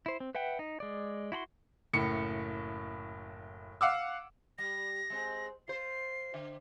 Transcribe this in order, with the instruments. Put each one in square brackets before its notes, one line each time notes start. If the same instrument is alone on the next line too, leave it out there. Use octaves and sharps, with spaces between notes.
[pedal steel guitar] E4 C5
C4
B4 E5 F#5 G5
D#4
G#3 D5
E4 F#4 B5 C6
[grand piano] F#1 A2 C#7
F5 F#5 D6 E6
[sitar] G3 [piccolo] A#6
[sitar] G#3 C4
[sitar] F4 C5 [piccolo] C7
[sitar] D3 E5